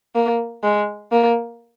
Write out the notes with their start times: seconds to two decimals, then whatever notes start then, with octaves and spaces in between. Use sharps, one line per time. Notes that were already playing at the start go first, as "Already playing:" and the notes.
0.15 A#3
0.64 G#3
1.12 A#3